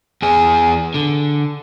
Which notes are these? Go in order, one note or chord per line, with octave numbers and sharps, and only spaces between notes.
E2 G#4
D3